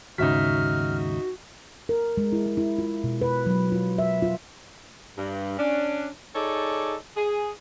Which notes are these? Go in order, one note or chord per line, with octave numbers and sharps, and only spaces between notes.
D#2 G#2 C#3 D#4 F#4 E5 F6 B6
A#4
G#3
E4
G#3
E4
F4
B2
B4
F#3
F4
E5
F4
G2
C#4 D4
D#4 G#4 A4 C#5 D5
G#4